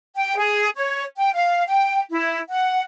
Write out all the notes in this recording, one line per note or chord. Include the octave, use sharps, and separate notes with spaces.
G5
G#4
C#5
G5
F5
G5
E4
F#5